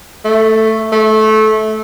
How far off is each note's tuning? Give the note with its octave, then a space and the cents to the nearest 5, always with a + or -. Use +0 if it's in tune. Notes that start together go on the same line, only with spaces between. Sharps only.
A3 +5
A3 -20